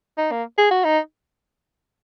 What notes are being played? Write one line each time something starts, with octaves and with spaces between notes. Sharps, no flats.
D#4
A#3
G#4
F#4
D#4